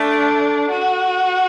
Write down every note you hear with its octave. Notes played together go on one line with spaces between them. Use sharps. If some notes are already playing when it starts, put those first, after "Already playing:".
Already playing: A3 D4
F#4